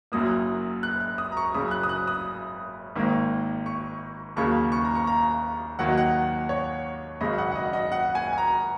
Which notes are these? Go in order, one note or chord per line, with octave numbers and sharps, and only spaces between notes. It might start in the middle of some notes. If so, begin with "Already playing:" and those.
F#1 F#2 F#3 A#3 D#6
F#6
F#6
D#6
A#5
C#6
F#1 F#2 C#3 D#6
F#6
D#6
F#6
D#6
G#1 G#2 D#3 A#3
C#6
D#2 C#3 F#3 A#3 C#6
C#6
A#5
C#6
A#5
D#2 D#3 F#3 A#3 F#5
D#5
F#5
C#5
G#1 F#2 C#3 D#5
F#5
F#5
D#5
D#5
F#5
G#5
G#5
A#5